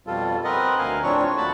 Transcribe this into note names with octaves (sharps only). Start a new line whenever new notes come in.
F2 B2 G3 F4 A4
C4 A#4 B4 D#5 F#5
D2 A#4 F5 G#5
A2 F3 C4 D4 C#5 C#6
D2 F3 A#3 F#4 A5 B5